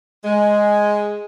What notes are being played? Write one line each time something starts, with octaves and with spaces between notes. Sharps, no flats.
G#3